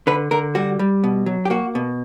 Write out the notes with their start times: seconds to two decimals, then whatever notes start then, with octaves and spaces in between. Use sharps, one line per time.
0.07 D3 B4
0.31 D3 A#4
0.55 G3 F#4
0.79 G3
1.04 B2
1.26 F#3
1.45 G4
1.50 A#3 F#4
1.75 B2